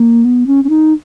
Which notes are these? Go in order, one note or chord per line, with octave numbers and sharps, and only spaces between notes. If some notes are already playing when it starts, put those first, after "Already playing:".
Already playing: A#3
B3
C#4
C#4
D#4